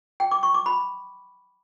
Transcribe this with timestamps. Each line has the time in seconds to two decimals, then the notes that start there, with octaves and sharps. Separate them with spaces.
0.20 G5
0.31 D6
0.43 C#6
0.54 D6
0.66 B5